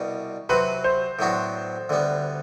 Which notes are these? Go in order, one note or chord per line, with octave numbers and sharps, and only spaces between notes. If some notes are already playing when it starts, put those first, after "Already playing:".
Already playing: C2 B2 G3
C3 F#3 C4 F#4 B4
C5
A2 F#3 B3 D4 F#4
D2 D3 G3 B3